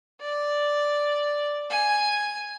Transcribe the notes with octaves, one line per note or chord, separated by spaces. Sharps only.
D5
G#5